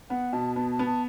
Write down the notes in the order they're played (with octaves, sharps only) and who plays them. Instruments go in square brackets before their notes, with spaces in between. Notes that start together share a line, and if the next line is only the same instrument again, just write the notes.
[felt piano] B3 [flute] F#5
[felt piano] B2 [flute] A5
[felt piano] B3 [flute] A5
[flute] A5
[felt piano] B3
[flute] A5